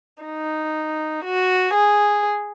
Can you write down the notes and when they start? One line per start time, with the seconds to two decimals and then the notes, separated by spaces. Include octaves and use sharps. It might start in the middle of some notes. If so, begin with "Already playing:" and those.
0.23 D#4
1.24 F#4
1.73 G#4